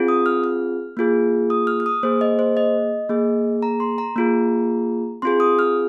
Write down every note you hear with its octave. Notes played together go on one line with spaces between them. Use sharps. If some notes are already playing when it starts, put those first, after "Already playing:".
Already playing: C4 F4 G#4
D#6
F6
F6
A#3 F4 G#4
D#6
F6
F6
D#6
A#3 G#4 C5
D#5
C5
D#5
A#3 G#4
A#5
C6
A#5
A#3 F4 G#4
C4 F4 G#4 C6
D#6
F6